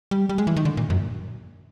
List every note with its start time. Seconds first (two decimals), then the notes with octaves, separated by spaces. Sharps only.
0.11 G3
0.29 G3
0.38 G#3
0.47 E3
0.56 D#3
0.65 D3
0.77 A#2
0.90 F#2